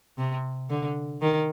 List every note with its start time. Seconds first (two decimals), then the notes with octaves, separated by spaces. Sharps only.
0.18 C3
0.70 D3
1.21 D#3